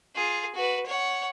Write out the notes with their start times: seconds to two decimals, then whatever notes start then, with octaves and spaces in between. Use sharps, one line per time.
0.16 F4 G#4
0.54 F#4 B4
0.86 C#5 F#5